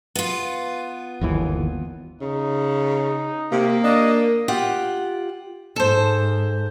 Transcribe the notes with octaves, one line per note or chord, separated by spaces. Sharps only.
B3 F4
G1 D#2 E3
C#3 D#4
C3 A#3
D4 D#5
F4 G4 F#5
G#2 A4 C5